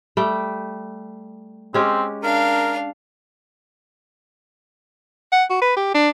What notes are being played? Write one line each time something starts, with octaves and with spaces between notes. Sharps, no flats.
G3 A3 G5
G#3 C4 C#4 G4
D4 A#4 F5
F#5
F#4
B4
G4
D4